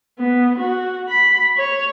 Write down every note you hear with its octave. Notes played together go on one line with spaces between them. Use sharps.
B3
F#4
B5
C#5